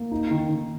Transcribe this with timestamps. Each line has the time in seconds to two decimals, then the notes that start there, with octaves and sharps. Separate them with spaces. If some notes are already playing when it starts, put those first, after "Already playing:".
Already playing: A#3
0.12 D#4
0.31 D#3
0.49 D#3